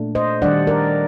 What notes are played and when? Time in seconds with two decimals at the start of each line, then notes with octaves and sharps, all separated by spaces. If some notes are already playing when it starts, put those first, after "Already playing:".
Already playing: A#2 A3 D4
0.15 C5 D#5
0.42 D#3 G3 D4 D5 F#5
0.67 A#4 D5